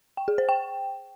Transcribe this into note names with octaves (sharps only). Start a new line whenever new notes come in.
G5
G#4
C5
G5